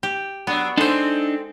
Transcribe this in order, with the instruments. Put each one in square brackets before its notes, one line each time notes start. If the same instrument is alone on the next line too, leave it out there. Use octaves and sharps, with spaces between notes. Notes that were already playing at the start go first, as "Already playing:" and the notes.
[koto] G4
[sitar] F#3 D4 [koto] B3
[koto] G#3 C5 [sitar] C4 A4 [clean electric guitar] D4 D#4